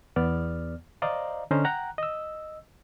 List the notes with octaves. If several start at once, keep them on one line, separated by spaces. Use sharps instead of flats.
E2 B3 D5 F6
C5 D5 D#5 F5 A#5
D3 C#4 C5 D#5 A#5 F6
F#5 G5 A#5 F#6
D#5 E6